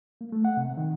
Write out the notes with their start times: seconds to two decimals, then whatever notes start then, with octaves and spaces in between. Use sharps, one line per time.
0.21 A#3
0.32 A3
0.45 F#5
0.57 C3
0.77 D#3